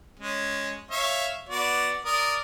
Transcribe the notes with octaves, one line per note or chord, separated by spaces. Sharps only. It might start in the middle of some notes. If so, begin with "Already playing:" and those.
G#3 C#4
C#5 E5 F5
B3 F#4 D5
A#4 D5 D#6